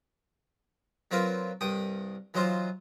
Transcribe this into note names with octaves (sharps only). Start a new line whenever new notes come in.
F#3 C4 F4 A#4 B4
C2 G2 G5 D#6
E3 F#3 D#4 F4 C5